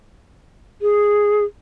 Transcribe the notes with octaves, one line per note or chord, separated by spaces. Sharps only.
G#4